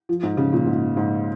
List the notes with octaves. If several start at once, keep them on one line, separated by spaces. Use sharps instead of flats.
F3
G#2
C#3
A#2
G#2
G#2